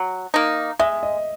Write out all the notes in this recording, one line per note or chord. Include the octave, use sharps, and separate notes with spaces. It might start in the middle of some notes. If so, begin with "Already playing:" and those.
Already playing: F#3
A#3 D#4
G#3 E5
D#5